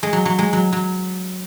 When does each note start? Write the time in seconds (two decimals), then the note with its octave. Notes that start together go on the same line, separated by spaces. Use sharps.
0.03 G#3
0.13 F#3
0.25 F#3
0.39 G#3
0.53 F#3
0.73 F#3